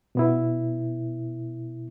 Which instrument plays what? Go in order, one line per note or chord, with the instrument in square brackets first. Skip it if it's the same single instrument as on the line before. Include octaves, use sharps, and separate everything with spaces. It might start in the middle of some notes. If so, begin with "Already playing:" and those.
[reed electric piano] B2 B3 E4